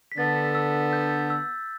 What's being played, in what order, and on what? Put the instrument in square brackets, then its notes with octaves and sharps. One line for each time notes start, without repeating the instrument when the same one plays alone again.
[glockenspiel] B6
[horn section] D3 B3 D4 A4 [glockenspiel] A6
[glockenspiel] E6
G6
E6